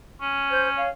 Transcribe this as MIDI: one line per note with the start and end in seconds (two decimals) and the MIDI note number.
0.21 0.86 61
0.50 0.68 72
0.50 0.68 91
0.76 0.88 73
0.76 0.88 77